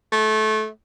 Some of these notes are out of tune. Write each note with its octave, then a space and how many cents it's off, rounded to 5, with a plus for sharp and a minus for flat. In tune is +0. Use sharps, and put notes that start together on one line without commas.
A3 -20